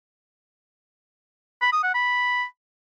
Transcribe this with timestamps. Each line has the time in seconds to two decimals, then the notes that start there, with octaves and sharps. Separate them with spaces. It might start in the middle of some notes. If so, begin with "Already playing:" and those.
1.61 B5
1.72 D#6
1.83 F#5
1.94 B5